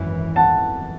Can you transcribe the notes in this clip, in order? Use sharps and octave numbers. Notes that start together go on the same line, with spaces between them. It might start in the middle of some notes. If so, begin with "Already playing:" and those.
Already playing: G#1 F#2 E3
F#5 A5